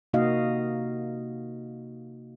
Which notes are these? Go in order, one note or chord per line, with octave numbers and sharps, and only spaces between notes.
C3 A#3 D#4 F#4 D#5 F5